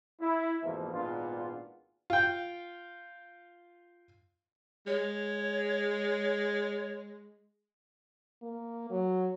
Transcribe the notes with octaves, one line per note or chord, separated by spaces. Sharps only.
E4
F2 G#2 B2 E3 F3 A#3
G#1 A#2 B3 D4 F4
F4 G5
G#3 C#5
A#3
F#3